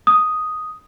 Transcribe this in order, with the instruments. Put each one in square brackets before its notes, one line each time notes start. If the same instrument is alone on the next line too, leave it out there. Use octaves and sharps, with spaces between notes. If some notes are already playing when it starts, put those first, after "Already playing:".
[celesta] D#6